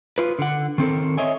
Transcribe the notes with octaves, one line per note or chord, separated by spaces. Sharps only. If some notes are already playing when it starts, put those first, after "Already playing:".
F4 B4
D3 F#5
D#3 C4 A4 A#4
C#5 D#5 E5 G#5